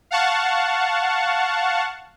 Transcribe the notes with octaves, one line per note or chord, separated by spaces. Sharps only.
F5 F#5 A5 C#6